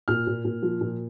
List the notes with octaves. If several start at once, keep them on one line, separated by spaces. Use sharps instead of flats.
A#2 F6
A#2
A#2
F3
A#2